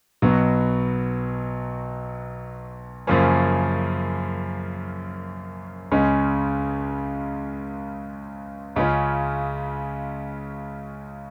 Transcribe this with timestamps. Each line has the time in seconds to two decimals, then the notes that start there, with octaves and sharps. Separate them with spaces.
0.22 B1 B2 F#3 B3 F#4
3.07 F#2 C#3 F3 A#3 C#4
5.92 C#2 C#3 G#3 C#4
8.76 C#2 C#3 G#3 C#4 F4